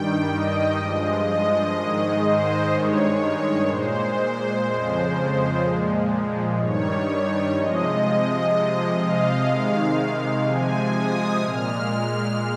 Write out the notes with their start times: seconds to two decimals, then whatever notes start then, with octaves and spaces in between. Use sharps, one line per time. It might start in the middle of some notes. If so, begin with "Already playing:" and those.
Already playing: G2 D#3 G3 G5
0.29 D#5
0.77 G2 F3 G#3
1.26 D#5
1.74 G#2 D#3 G#3
2.22 C5
2.71 G2 D#3 G#3 C#5
3.68 A#2 G#3 C5
4.64 F2 C#3 F3 G#3
5.61 A#2 F3 G#3
6.58 G2 D#3 G3 C#5
7.55 C3 F3 G#3 D#5
8.03 D#5
8.52 C3 F3 G#3
9.00 F5
9.49 C3 D#3 G#3
10.46 C3 F3 G#3 G#5
10.94 D#6
11.42 A#2 G#3 F6